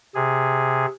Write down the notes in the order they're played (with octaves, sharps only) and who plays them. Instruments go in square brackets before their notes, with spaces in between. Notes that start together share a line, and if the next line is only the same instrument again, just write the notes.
[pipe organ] C3 G#4